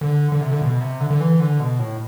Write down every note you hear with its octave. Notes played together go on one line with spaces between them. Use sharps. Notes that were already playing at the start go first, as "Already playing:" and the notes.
D3
D3
C3
D3
B2
C3
D3
D3
E3
D3
B2
A2